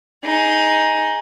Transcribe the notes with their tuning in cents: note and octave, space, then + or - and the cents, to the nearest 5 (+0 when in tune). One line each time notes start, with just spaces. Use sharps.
D#4 +10 G#4 +0